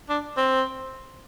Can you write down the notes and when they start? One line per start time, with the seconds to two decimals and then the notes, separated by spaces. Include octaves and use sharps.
0.09 D4
0.37 C4